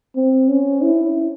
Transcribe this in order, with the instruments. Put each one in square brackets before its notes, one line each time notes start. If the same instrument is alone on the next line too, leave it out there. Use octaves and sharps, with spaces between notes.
[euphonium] C4
C#4
E4